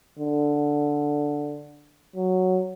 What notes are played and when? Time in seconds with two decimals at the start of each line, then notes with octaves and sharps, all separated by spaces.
0.19 D3
2.16 F#3